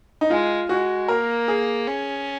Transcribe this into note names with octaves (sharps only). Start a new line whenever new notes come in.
D#4
G#3 F4
G#3 F#4
A#3 A#4
G#4
C#4